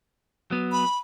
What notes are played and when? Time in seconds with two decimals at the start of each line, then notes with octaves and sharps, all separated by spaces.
0.51 F#3 B3
0.72 B5